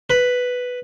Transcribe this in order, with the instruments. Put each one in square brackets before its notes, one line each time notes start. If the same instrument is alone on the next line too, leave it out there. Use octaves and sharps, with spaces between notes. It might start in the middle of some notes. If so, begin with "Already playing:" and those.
[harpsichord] B4